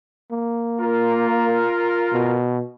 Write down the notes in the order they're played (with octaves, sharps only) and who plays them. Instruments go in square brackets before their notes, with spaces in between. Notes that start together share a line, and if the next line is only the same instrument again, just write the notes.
[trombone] A#3
[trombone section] F4 A#4
[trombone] B2